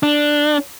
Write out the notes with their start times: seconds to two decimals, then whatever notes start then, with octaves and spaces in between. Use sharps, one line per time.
0.03 D4